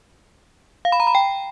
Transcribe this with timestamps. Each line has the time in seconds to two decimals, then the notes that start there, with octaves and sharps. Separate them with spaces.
0.85 F5
0.92 B5
1.00 A#5
1.07 B5
1.15 G5